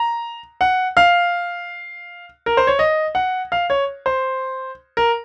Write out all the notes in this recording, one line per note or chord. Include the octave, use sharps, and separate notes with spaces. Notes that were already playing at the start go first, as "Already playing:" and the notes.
Already playing: A#5
F#5
F5
A#4
C5
C#5
D#5
F#5
F5
C#5
C5
A#4